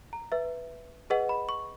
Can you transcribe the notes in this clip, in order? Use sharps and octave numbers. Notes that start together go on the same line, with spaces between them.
A#5
B4 E5
G#4 B4 D#5 F#5
B5
C#6